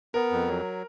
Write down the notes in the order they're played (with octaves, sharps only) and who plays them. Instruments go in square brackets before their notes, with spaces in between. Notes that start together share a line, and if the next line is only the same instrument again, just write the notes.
[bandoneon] B3 [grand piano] A#4
[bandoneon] F2
F#3